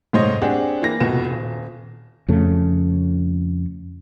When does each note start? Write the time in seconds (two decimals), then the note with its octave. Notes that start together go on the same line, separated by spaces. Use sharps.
0.13 F1 G#2 C5 C#5 D#5
0.42 C4 D4 G4 G#4 F#5
0.82 E3 A#3 A#6
1.00 F1 C#2 B2 B3 E7
1.30 D#1
2.28 F2 C#3 A3